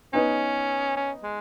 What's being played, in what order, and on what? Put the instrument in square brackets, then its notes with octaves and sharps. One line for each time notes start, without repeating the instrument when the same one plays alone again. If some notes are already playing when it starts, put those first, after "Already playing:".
[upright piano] B3 D#4 B4 [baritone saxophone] C#4
[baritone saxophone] C#4
G#3